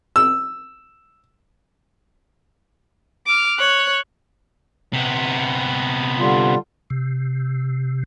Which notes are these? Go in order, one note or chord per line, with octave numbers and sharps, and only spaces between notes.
E6
D6 F6
C#5 F#6
C3 B3
D3 G3 F4
C3